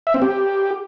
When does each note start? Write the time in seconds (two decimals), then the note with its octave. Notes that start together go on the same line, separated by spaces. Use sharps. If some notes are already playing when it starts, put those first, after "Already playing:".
0.07 E5
0.14 C4
0.22 G4